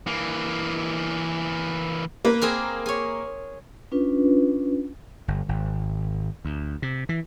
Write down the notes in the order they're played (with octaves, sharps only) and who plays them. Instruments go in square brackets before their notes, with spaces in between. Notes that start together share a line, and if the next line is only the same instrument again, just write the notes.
[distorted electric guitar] E3 A#3
[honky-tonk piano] A#3 [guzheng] B4
[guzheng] C4 G#4 A#4
G#4 C#5
[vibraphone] C#4 D4 F4 B4
[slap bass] G1
G#1
D2
C3
E3